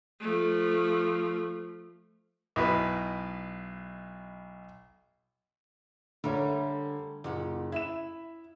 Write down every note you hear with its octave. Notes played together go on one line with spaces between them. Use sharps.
F3 A3
B1 B2 E4 B4
D3 G3 A3 A#4 C#5
F#1 A#2 G4 F#5
E4 E5 E7